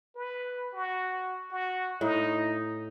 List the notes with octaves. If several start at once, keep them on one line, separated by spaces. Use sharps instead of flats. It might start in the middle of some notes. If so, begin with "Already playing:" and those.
B4
F#4
F#4
A2 D#4